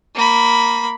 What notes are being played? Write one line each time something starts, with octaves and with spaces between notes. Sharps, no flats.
A#3 B5